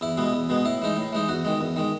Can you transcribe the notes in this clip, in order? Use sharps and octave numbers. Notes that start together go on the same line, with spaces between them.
E2 E4
B2 G#3 B3
E2
B2 G#3 B3
A2 E4
E3 G#3 D#4
A2
E3 G#3 D#4
E2 F#4
D#3 G#3
E2
D#3 G#3